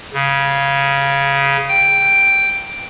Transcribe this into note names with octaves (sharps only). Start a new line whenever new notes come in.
C#3
G5